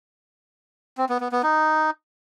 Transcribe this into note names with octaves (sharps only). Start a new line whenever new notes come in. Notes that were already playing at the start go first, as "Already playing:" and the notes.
C4
B3
B3
B3
D#4